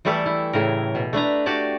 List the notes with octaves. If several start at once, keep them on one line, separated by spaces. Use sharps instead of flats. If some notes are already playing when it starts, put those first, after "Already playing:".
E3 G3 A3 E4 G4 A4
E4
A2 C#3 A#4
B2
A3 D4 B4 A#5
F#4 G4 D5 A5